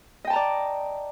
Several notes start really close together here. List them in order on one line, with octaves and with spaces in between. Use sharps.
D#5 G5 A5 A#5 D5